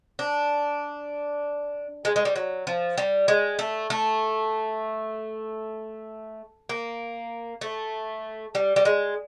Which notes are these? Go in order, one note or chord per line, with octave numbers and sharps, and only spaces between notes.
D4
G#3
G#3
G3
F#3
F3
G3
G#3
A3
A3
A#3
A3
G3
G3
G#3